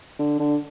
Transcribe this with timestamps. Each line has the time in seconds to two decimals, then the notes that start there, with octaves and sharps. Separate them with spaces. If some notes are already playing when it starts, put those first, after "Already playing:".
0.19 D3
0.39 D3